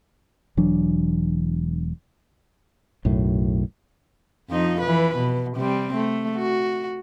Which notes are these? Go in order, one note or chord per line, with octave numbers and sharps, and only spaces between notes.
E1 E3 F#3 D4
B1 F#2 A2
F2 F3 D#4
E3 B4
B2
C3 G3 C4
A3
F#4